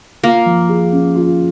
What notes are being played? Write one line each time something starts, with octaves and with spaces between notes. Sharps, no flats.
A#3 F4
F3
G#4
C#4
F4